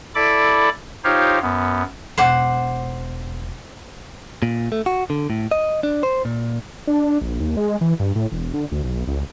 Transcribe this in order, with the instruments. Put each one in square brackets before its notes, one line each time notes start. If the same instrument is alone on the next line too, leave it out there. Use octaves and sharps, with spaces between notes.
[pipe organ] E4 A4 D5 B5 D6
D#4 F4 G4 C5 C#5 F5
F#2 B3
[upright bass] E1 [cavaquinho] C5 F#5 D6
[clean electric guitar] A#2
A3
F#4
D3
A2
D#5
D4
C5
A#2
[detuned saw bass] D4
A#1
D#2
G#3
E3
G2
A2
E1
D3
D2
B1
C#2